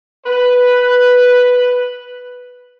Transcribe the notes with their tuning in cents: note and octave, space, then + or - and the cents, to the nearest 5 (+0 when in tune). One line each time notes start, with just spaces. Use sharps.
B4 +0